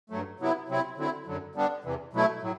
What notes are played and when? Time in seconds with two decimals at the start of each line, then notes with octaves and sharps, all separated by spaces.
0.10 G2 F#3 A3
0.40 C3 F#3 B3 E4
0.69 C3 F#3 C4 E4
0.97 D3 F#3 C4 E4
1.27 F#2 D3 F#3
1.55 D3 G3 B3 D4
1.84 E2 C3 E3
2.13 B2 F#3 A3 E4
2.41 A2 F#3